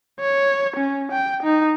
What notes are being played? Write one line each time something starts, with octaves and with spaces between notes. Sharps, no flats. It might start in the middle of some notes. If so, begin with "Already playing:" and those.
C#5
C#4
G5
D#4